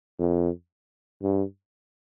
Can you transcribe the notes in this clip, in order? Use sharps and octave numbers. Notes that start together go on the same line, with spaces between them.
F2
G2